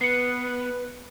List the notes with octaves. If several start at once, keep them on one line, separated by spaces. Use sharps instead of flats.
B3 B4 C7 C#7